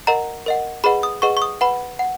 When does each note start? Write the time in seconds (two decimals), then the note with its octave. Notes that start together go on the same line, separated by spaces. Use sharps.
0.07 A#4 D#5 F#5 A#5
0.46 A#4 D#5 F#5
0.84 G#4 B4 D#5 F#5 B5
1.03 D#6
1.22 G#4 B4 D#5 F#5 C#6
1.37 C#6
1.42 D#6
1.61 B4 F#5 B5
1.99 F#5